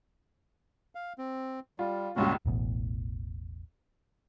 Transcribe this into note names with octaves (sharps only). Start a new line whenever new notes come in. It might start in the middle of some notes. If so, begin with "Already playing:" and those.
F5
C4
G3 F4
C#2 G2 A#2 C#4 F4 F#4
E1 A1 E2